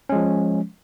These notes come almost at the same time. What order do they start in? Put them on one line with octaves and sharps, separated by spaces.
C#4 G#3 F3